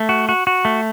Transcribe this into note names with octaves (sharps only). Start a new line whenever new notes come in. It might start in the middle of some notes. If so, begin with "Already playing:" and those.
Already playing: A3
F#4
F#4
F#4
A3